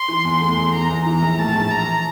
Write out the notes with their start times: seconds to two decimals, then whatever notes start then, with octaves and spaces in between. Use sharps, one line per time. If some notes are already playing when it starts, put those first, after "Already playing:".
Already playing: C6
0.08 E3
0.25 E2
0.41 A3 C6
0.57 E2
0.73 E3 A#5
0.89 E2
1.06 E3 A#5
1.22 A#1
1.39 A2 A5
1.54 A#1
1.70 E3 A#5